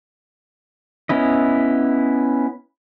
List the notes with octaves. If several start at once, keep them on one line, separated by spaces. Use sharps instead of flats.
B3 C#4 E4 D#5